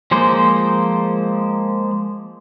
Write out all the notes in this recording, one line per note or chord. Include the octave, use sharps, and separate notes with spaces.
F3 G#3 A#3 C5